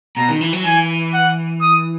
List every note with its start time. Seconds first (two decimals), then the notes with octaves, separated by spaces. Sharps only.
0.16 B2 A#5
0.29 D#3
0.41 E3
0.53 F#3
0.65 E3 G#5
1.14 F#5
1.61 D#6